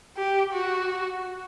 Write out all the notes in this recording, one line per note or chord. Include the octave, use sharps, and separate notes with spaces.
G4
F#4